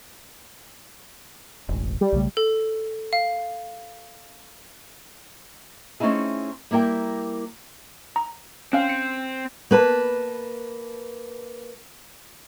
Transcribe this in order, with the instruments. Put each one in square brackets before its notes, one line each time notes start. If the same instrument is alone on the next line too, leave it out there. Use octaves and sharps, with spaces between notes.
[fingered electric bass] E1 A1
[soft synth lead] G3
[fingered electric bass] B1 C#3 A3
[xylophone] A4
F5
[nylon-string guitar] A3 C4 C#4 D#4 E4 G#4
G3 A#3 E4 A#4 G5
[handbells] A#5
[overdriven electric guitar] C4 [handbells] C#4 F5
[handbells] C#7
[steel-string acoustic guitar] A#3 B4 A5